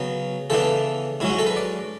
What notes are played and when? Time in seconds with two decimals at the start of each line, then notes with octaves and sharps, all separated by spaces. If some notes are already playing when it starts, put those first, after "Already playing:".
Already playing: C#3 F#3 B3
0.50 C#3 E3 B3 D4 A4
1.20 G#2 F#3 C#4 E4
1.30 F#4
1.39 A4
1.47 B4
1.56 D5